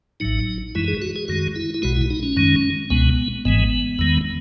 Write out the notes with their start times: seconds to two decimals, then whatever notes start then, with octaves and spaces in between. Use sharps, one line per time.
0.20 A1 A2 F#3 D#4
0.75 F#2 E3 G#3 E4
0.88 G#4
1.02 F#4
1.16 G#4
1.28 F#2 D#3 G#3 F#4
1.56 E4
1.74 E4
1.82 B1 B2 G#3 F#4
1.96 E4
2.10 D#4
2.23 C#4
2.37 F#2 D#3 G#3
2.90 C#2 B2 G#3 B3
3.45 G#1 G#2 E3 G#3 B3
3.99 E2 D#3 G#3